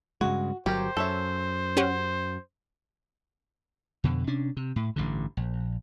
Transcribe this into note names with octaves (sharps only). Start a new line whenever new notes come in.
G2 C#3 G#3 F#4
G1 F#3 G4 A#4 C5
F#2 A4 C#5 E5
C#4 G4 F#5
F2 B2 D3
C3 C#4 D4
C3
A2
A1 G2 D3
A#1